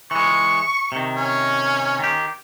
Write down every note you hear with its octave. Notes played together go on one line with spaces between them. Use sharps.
E3 G#3 C#6
C3 D#3
C#4
D#3 G4